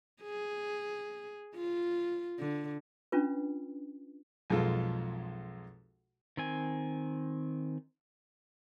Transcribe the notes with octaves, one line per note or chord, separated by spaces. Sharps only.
G#4
F4
D3
C#4 D4 F4 B4
B1 F2 G#3 F4 A4
D#3 C4 G#5